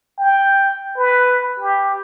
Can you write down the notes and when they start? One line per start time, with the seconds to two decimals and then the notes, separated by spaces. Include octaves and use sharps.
0.18 G5
0.97 B4
1.60 G4